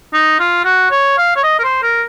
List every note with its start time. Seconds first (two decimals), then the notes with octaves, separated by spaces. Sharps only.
0.13 D#4
0.40 F4
0.65 F#4
0.91 C#5
1.18 F5
1.36 C#5
1.43 D#5
1.59 A#4
1.64 C5
1.83 A#4